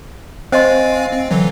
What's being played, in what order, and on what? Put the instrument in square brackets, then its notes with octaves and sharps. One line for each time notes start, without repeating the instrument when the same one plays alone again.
[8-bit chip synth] C4 F5 G#5 [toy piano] C5 D#5 C6
[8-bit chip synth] C4
D3 E3 F#3